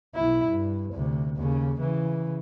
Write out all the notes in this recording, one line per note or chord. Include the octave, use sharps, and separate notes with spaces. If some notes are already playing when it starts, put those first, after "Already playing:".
B1 E4
G2
D2 C3
D#2 C#3
C#3 E3